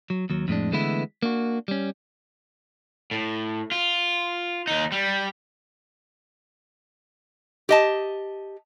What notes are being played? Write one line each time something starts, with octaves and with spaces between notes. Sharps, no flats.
F#3
D#2 F#3
F2 A2 G#3 D4
D3 E3 G#3 A3 B3 E4
A#3 D4 F#4
G3 C#4
A2
F4
D#2 D#4
G3
G4 D#5 A5